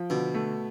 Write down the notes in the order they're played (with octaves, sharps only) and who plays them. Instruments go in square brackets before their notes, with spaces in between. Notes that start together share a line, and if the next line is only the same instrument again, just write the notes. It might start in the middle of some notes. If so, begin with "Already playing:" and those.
Already playing: [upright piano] F3
[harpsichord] B2 [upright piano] D3
[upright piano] A3